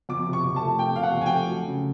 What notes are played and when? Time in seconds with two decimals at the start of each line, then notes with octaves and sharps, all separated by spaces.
0.09 F2 D6
0.27 C3
0.33 C#6
0.45 F2
0.56 A5
0.62 A3
0.79 C3 G5
0.96 C3 F5
1.03 F#5
1.14 F2
1.21 G#5
1.26 G5
1.32 A3
1.49 F#3
1.66 C#3